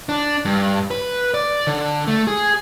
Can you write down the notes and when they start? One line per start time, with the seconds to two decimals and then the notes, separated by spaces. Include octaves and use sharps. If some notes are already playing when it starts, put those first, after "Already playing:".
0.09 D4
0.45 G2
0.91 B4
1.34 D5
1.67 D3
2.07 A3
2.27 G#4